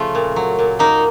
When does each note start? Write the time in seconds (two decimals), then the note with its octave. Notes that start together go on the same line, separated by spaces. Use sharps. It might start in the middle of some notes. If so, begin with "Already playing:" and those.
Already playing: C#3 F3 A3 F4
0.15 A#2
0.36 F#3
0.59 A#2
0.79 A#3 D#4